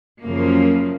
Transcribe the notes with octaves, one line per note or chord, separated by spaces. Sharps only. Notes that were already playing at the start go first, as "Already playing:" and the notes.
F#2 C#3 F3 A#3